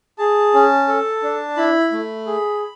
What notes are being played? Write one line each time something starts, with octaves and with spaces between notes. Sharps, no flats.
G#4 A5
C#4
A4
D4
E4 B5
A3
G#4